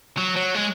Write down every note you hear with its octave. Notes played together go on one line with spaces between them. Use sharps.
F#3
F#3
G#3